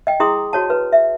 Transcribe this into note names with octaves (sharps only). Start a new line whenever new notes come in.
D#5 G5
E4 G#4 A#5 C6 D#6
F#4 C#5 A5
B4
E5